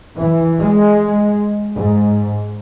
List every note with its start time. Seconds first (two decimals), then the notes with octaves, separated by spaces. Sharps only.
0.17 E3
0.61 G#3
1.76 G#2